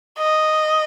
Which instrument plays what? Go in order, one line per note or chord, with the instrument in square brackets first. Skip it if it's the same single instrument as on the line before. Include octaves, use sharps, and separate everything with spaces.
[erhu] D#5